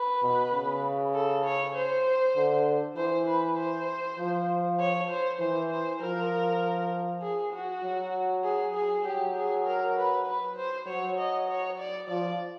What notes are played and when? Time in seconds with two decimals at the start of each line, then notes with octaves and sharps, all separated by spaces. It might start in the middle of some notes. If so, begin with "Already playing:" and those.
Already playing: B4
0.23 B2
0.54 C#3
1.15 A4
1.45 C#5
1.76 C5
2.36 D3
2.97 E3 C5
3.27 B4
3.58 C5
4.19 F3
4.80 C#5
5.10 C5
5.40 E3 C5
5.71 C5
6.01 F3 A#4
7.22 G#4
7.53 F#4
7.84 F#3
8.44 G#4
8.75 G#4
9.05 F#3 G4
9.36 G#4
9.66 A#4
9.96 B4
10.27 B4
10.57 C5
10.88 F#3 C#5
11.18 D#5
11.49 C#5
11.79 D5
12.09 F3 D5